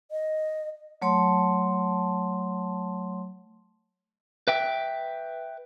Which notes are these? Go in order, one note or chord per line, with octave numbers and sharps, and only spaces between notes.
D#5
F#3 A3 C#5 A5 C6
B4 E5 G5